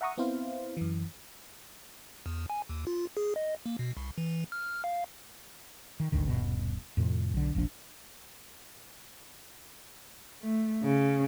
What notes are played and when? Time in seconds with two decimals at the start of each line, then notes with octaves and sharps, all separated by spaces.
0.01 E5 F#5 A#5 C#6 D#6
0.18 B3 C4 E4 C5 F5
0.77 F#2 E3
2.26 E2
2.50 G#5
2.69 D#2
2.87 F4
3.17 G#4
3.36 D#5
3.66 A#3
3.79 B2
3.97 C2
4.18 E3
4.52 F6
4.84 F5
6.00 D#3
6.12 D#1 G#1 D2 D#3
6.28 D#1 G2 B2
6.97 F2 A2 C3
7.34 B1 D3
7.55 E1 A#1 F3 D4
10.42 A3
10.83 C#3